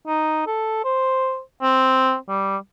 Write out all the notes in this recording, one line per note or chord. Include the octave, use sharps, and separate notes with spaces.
D#4
A4
C5
C4
G3